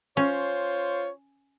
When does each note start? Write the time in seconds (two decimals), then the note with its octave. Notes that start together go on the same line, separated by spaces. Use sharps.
0.17 C#4 F4 C5 C#5